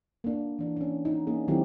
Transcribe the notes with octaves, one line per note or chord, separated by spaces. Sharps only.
A#3 D4
E3 D4
C#4 D4
D#4
A#3 C#4 G#4
D3 D#3 F#3 C4 E4 G4